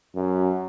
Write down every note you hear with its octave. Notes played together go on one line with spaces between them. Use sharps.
F#2